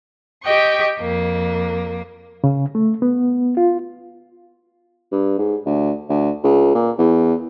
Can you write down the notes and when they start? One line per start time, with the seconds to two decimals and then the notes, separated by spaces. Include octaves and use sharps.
0.43 G4 D#5 G5 C#6
1.00 F2 A#3
2.44 C#3
2.75 A3
3.02 B3
3.57 F4
5.12 G2
5.38 G#2
5.66 D2
6.09 D2
6.43 C#2
6.75 A#2
6.98 E2